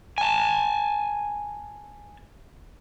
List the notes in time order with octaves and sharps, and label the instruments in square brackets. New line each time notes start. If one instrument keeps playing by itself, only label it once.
[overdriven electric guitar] G#5 A5